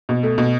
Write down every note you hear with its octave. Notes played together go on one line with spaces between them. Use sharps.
B2
A3
B2